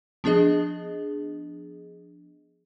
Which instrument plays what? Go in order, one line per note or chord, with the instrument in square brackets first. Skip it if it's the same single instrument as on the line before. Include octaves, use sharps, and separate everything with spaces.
[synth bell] F3 B3 D4 G#4 D#5